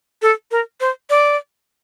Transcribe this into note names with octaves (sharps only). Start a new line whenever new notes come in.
A4
A#4
C5
D5